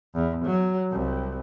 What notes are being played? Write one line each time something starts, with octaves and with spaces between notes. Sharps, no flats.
E2
F#3
C2